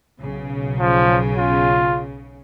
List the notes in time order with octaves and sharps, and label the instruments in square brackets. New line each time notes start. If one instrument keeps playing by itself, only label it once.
[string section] B1 C#3
[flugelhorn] F3
F4